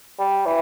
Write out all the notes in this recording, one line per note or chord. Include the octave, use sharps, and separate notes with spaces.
G3
E3